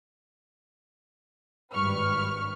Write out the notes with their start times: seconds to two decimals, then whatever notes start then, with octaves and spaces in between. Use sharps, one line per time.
1.74 G#1 G2 B4 C#6 F6